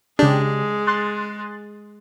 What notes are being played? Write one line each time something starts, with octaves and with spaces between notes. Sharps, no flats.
C#3 G#3 D4 G4 G#4
C6 F#6 A6